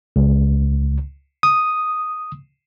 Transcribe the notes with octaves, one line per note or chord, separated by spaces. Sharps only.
C#2
D#6